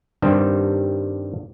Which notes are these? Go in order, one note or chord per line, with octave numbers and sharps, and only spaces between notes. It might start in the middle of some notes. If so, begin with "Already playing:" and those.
G2 D#3 G3 C4 G4 C5